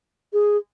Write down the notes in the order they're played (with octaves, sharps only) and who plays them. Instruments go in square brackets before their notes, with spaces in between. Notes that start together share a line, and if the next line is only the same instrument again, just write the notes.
[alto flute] G#4